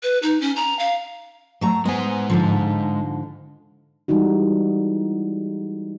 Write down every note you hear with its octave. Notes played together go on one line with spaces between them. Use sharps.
B4
D#4
C#4
A#5
F5
F#3 A3 A#5
G#3 B3 C5 G#5
G#2 D3 F3
E3 G3 G#3 D#4 F#4